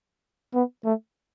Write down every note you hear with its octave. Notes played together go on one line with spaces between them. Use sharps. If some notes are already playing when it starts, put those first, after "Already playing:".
B3
A3